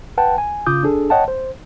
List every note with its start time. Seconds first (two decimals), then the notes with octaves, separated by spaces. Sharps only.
0.18 B4 F#5 G5 A5
0.38 G#5
0.66 C#3 F4 D6 D#6 G6
0.83 D4 G#4 A4
1.10 C#5 D#5 F#5 G5 A5
1.28 C5